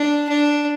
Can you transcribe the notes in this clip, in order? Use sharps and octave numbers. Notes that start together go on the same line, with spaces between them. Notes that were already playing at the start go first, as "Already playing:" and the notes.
Already playing: D4
D4